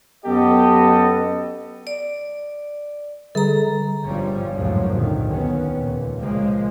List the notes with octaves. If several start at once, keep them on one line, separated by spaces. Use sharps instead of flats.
F#2 B3 G4 A4 D#5
D5
D3 G3 G#4 A4 A#5
G1 G2 F3 G3 C#4
G#1 C#2 F#2 A2 F3 F#3
A#2 D3 D#3
D#2 D#3 B3 C#4
C#2 A#2
C#3 F3 G#3 A#3